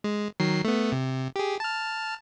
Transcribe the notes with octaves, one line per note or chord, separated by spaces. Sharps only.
G#3
D#3 F#3 C7
A3 B3
C3
G4 G#4
A5 F6